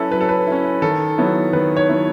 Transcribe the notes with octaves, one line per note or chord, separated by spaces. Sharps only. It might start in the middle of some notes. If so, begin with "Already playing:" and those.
Already playing: F#3 C#4 E4 A4 B4
F#3 B4
A4
B4
C#4 E4
D#3 A4
F#3 B3 E4
D#3 B4
C#5
F#3 B3 E4